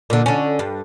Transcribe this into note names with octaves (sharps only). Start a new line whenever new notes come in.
A#2 D3
D3 C#4
G2